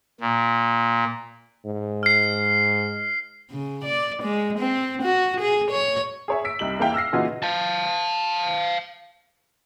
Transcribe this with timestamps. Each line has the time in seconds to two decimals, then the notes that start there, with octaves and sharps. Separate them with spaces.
0.21 A#2
1.65 G#2
2.03 F6 C7
3.51 C#3
3.84 D5
4.23 G#3
4.59 C4
5.02 F#4
5.41 G#4
5.71 C#5
6.28 G#4 C#5 E5
6.44 E6 B6 D7
6.59 C2 G3 D#4 F#7
6.79 E2 A#3 E4 F5 G5
6.94 E6 F6 A#6 C7
7.12 A#2 C#3 E3 D#4 F4 F#4
7.43 F5 A5